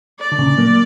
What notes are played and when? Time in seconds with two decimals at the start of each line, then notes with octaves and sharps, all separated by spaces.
0.20 D5
0.32 D3
0.39 A#2 C#3
0.58 F#3 A#3